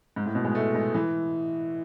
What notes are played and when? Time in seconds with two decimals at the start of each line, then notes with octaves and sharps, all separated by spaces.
0.16 G#2
0.26 A2
0.35 B2
0.45 G#3
0.55 A3
0.75 G#3
0.94 E3